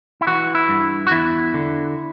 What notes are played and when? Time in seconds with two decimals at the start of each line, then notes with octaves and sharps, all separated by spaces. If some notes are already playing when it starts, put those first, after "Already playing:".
0.21 E4
0.27 E3 F#4
0.55 E4
0.69 G2
1.07 F#4
1.11 E2 E4
1.54 D3